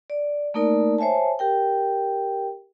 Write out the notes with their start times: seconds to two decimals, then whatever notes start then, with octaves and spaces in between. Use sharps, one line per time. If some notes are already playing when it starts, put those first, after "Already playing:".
0.10 D5
0.54 A3 A#3 D#4 A#4 D5
0.98 C5 C#5 E5 G#5 A5
1.39 G4 A#4 G5